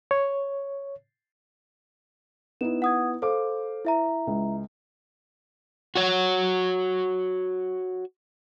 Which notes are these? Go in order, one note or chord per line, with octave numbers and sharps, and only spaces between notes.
C#5
B3 D#4 E4 E7
F#5 D#6 G#6
A4 C5 F5 D6
E4 E5 A#5
C#2
F#4 C#5